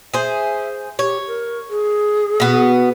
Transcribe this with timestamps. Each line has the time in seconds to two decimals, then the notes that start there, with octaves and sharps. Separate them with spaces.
0.14 G#4 C5 E5
0.99 G4 C#5
1.27 A#4
1.70 G#4
2.40 B2 B3